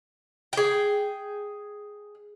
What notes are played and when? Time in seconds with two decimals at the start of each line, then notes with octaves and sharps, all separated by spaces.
0.53 G#4 G5